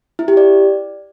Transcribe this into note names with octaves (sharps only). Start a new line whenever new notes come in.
E4
G4
D5